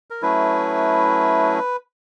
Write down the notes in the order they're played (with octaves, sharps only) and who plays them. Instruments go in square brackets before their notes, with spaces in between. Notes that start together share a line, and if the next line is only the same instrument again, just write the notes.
[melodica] A#4
F#3 A3 C#4 E4 B4